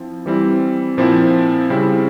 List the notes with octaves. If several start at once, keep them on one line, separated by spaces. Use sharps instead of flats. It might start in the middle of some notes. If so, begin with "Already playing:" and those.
Already playing: F3 C4 E4
E3 G3 C4 E4
A#2 F3 C4 E4
C#3 G3 C4 E4